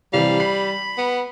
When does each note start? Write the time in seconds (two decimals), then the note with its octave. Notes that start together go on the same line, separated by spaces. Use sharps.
0.13 C3 E3 G3 F5
0.40 B5 C7
0.98 B3